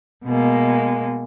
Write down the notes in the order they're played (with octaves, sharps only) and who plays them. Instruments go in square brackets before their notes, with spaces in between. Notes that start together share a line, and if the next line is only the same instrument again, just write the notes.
[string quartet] B2 G#3 A#3